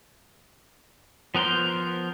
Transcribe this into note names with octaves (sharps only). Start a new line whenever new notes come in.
F3 B3 A#4 C5 C6